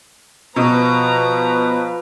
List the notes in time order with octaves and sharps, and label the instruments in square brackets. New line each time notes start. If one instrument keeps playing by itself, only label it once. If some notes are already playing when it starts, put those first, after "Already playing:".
[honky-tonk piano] B2 [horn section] F3 B4 [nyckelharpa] A#5